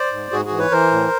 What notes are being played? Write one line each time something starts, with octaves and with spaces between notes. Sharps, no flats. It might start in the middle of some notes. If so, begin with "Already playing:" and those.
Already playing: C5 D5
G#2
G#2 F#4 G#4
F#4 G#4
E3
B4 C#5
E3 A#4 C5
A2